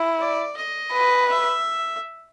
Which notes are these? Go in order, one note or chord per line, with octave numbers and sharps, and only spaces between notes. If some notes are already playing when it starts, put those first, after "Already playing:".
Already playing: E4
D5
D#5
B4
E5